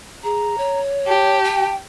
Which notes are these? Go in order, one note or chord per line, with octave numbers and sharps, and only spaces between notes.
G#4 A#5
C#5
G4 A5
G5